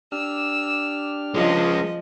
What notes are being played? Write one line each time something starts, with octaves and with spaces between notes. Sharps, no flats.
D4 G4 E6 F6
F3 G#3 C#4 D#5